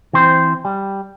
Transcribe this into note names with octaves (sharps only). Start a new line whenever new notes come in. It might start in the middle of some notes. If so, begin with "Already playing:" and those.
E3 C4 C5
G3